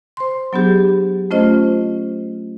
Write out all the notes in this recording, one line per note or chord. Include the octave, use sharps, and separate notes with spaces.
C5 C6
F#3 B3 D4 G4 G#4
A3 C#4 F4 C5 D#5